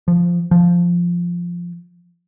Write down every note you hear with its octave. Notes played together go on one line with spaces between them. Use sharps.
F3
F3